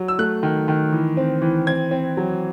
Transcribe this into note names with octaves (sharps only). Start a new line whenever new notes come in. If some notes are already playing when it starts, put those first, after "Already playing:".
Already playing: F#3
E6
A3 F#6
D#3
D#3
E3
C4
E3
C4 G#6
C4
F#3